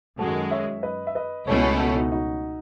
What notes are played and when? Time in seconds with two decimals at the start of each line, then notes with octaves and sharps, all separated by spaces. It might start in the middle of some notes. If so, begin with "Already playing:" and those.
0.19 F#2 D#3 G#3 F#4 A4
0.51 C#5 E5
0.83 B4 D#5
1.07 E5
1.15 B4 D#5
1.47 C#2 B2 A3 C#4 E4 A4 C#5
1.63 F#4 A4
1.79 F#4 A4
1.96 D#4 F#4
2.11 D#4 F#4